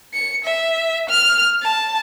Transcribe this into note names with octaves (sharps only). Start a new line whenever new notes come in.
C#7
E5
F6
A5